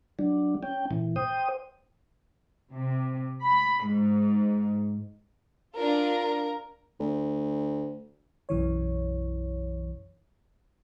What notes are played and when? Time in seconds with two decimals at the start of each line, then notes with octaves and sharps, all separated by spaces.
0.19 F#3 D4
0.63 C#4 G5
0.91 A#2 E3
1.16 C5 G5 D#6
2.72 C3
3.41 B5
3.86 G#2
5.76 D4 F4 A#4
7.00 D2
8.49 B1 F#2 E3 C#5